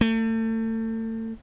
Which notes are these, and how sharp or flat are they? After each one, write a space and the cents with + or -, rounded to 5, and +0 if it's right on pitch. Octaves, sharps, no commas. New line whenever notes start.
A3 +35